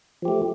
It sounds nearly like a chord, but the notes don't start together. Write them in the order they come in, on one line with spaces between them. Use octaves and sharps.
F3 G4 A3